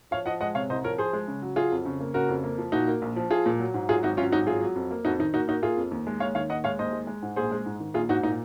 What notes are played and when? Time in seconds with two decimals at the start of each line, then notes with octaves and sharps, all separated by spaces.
0.11 F3 C#5 F5
0.26 F3 D#5 F#5
0.41 G#3 D#5 F#5
0.55 C3 C#5 F5
0.70 C2 C5 D#5
0.84 F3 A#4 C#5
0.98 F3 G#4 C5
1.13 G#3
1.28 C#3
1.42 F#3
1.56 F#3 F4 G#4
1.72 F2
1.85 C#3
2.00 A#3
2.14 C#3 F#4 A#4
2.29 F2
2.44 A#3
2.58 F3
2.72 A#2 D#4 F#4
2.88 A#3
3.02 A#1
3.16 F3
3.30 F3 F4 G#4
3.46 A#2
3.59 F#3
3.74 G#2
3.89 F#3 F4 G#4
4.03 G#1 D#4 F#4
4.17 F#3 C#4 F4
4.32 G#1 D#4 F#4
4.46 F#3 F4 G#4
4.61 F#3
4.75 F2
4.91 A#3
5.05 F2 D#4 F#4
5.19 D#3 D#4
5.34 A#3 D#4 F#4
5.48 A#3 D#4 F#4
5.63 A#3 F4 G#4
5.77 F2
5.91 D#2
6.07 G#3
6.20 D#2 C#5 F5
6.35 D#3 C#5 F5
6.50 D#2 D#5 F#5
6.64 G#3 C#5 F5
6.79 D#2 C5 D#5
6.93 G#3
7.07 G#3
7.23 G#2
7.36 A#1 G#4 C5
7.51 G#3
7.66 G#2
7.80 D#3
7.94 A#1 F4 G#4
8.09 G#2 D#4 F#4
8.23 A#2 D#4